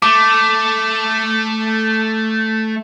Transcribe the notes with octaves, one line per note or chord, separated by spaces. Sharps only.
A3 D6